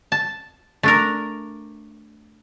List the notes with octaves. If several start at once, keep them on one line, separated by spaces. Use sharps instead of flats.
A5
A3 D4 A#4